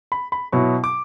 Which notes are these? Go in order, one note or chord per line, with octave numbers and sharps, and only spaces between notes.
B5
B5
B2 F#3 B3 E4 C#6
D6